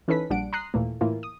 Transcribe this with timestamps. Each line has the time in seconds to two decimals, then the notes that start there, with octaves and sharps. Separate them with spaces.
0.08 E3 C#4 D#4 A4 B4 B6
0.30 A#1 G3 D4 F#5 D7
0.53 A#5 C6 D#6 F#6 C7
0.74 D#2 A#2 E3 A3 A#3
1.01 A2 E3 A#3 F4
1.23 D#6